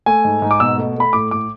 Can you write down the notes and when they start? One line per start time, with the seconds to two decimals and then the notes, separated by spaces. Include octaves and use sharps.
0.06 A3 G#5
0.24 G#2
0.42 G#2
0.51 D6
0.60 B2 E6
0.78 A3
0.96 A3 B5
1.13 A2 D6
1.31 A2 D6